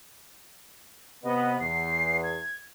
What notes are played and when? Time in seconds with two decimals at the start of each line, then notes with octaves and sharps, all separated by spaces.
1.23 C3 B3 D#5
1.60 E2 C7
2.23 G#6